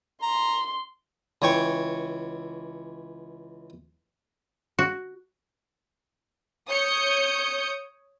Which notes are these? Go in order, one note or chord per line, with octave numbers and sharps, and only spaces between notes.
A#5 C6
C#2 E3 C#5 G5 C#6
F#4
C#5 D#6 G6 C#7